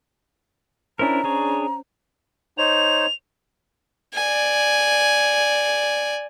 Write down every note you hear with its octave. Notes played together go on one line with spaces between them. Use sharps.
C#4 D4 E4 A#4 C5 A#5
D4 G#4 C#5
D#4 C5 C#5 F7
D5 G#5